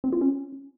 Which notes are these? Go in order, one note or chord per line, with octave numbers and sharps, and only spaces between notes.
C4
F4
C#4